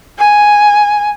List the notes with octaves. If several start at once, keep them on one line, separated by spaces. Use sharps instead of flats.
G#5